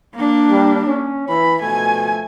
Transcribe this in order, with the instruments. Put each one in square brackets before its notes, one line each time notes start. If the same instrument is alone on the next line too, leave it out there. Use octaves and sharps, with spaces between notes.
[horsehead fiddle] A#3 D4
[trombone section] G3
C#4
[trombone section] E3 [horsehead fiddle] B5
[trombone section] B2 F3 A3 [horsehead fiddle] G#5